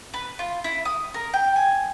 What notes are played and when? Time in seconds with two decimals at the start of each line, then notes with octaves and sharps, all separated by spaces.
0.14 B4
0.39 F4
0.64 E4
0.85 D#6
1.14 A#4
1.33 G5
1.56 G#5